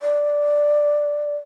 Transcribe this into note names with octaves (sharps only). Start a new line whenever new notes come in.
D5